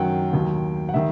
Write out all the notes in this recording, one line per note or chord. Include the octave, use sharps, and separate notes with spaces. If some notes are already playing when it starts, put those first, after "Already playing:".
Already playing: F#2 D#3 F#3 F#5 G5
D#2 D#3 F#3
F#5
D#3 G3 E5